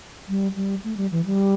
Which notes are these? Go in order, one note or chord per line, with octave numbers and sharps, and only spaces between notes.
G3
G3
A3
G3
E3
G3